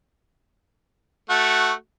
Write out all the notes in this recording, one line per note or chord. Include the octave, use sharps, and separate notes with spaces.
A3 F#4